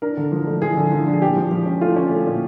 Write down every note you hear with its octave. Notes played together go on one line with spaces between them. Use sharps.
D4 A#4
D3
F3
A3
F3 G#4
D3
F3
D4
G#4
A#2 G4
F3
F3
C#4
A3 F4
C#4
A3
A#2